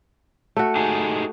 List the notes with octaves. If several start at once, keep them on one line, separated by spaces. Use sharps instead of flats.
A3 F#4
D#4 G4 G#4